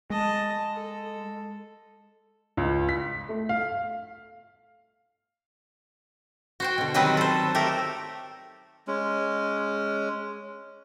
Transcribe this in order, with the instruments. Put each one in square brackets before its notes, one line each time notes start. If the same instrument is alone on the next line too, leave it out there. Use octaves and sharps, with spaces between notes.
[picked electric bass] G#3 [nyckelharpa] D#5 A5
[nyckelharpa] A4
[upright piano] C#2
B6
A3
F5
[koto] F#4 C5 G5
B2 D3
D#3 F#3 G3 C4 B4 D#5
A4 C5
A3 G4 A4 A#4
[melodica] G#3 C#4